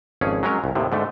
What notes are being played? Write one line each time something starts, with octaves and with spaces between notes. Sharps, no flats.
G#1 F2 C#4 G#4
F#3 G#3 C#4 A#4 C#5
C2
D#2 A2 C3
G#2 D3 A3